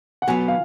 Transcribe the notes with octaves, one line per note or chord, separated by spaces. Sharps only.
F#5
B2 F#3 B3 G#5
F5